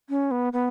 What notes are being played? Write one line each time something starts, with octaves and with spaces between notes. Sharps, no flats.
C#4
B3
B3